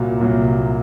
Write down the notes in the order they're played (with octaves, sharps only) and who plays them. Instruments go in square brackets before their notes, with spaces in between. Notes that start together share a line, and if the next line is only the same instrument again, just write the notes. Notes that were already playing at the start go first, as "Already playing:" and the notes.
Already playing: [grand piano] C2 A#2 F#3 A#3
C2 A#2 F#3 A#3